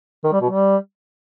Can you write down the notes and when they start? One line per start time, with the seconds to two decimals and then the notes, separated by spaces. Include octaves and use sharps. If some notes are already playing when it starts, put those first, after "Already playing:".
0.24 D#3
0.32 G3
0.41 B2
0.49 G3